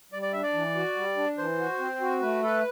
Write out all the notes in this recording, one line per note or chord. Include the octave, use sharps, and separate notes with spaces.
G3 D5
D5
D4 E5
D5
E3
F#4
G3
D4
E3 C5
F#4
C4
F#4
A3 B4
A4 B4